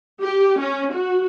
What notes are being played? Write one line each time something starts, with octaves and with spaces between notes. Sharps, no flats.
G4
C#4
F#4